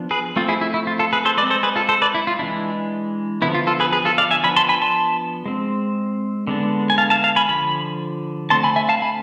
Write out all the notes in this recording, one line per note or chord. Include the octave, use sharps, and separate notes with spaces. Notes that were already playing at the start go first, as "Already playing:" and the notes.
Already playing: F3 B3 D4
G#4 B4
F3 A3 C4 F4
E4 G#4
E4
E4
F4
F4 A4
G#4 B4
A4 C5
G#3 B4 D5
C4
A4 C5
G#4 B4
F4 A4
A4 C5
B4 D5
E4
F4
E3 G#3 D4 E4
D3 F3 B3 E4
F4
F4 A4
G#4 B4
G#4 B4
F4 A4
D5 F5
E5 G#5
F3 B3 D4 G#5 B5
A5 C6
G#5 B5
A5 C6
G#3 C4
D3 G#3 B3 D4
G#5
F5 A5
F5 A5
F5 A5
G#5 B5
D3 F3 B5
D3 A3 C4 A5 C6
G#5 B5
E5 G#5
F5 A5
G#5 B5